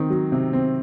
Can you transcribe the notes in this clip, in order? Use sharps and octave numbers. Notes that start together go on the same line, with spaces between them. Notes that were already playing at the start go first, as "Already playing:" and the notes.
Already playing: D#3 C4
F#3
C3
C4